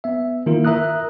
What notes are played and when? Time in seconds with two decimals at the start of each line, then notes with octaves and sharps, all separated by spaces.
0.04 B3 E5
0.46 D#3 A#3 E4 F4 A#4
0.65 A#4 E5 A#5 D#6 F#6